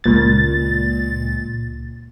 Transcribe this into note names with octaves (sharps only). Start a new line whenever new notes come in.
C#2 A#2 A6